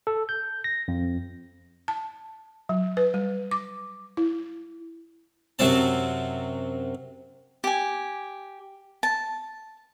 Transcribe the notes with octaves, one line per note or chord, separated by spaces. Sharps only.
A4
G6
A#6
F2
A5
F#3
B4
G3
D6
E4
F#2 C3 F#3 C4 A5
G4 G#5
A5